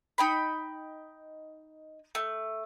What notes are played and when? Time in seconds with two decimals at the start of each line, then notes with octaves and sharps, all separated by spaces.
0.18 D#4 G5 B5
2.15 A3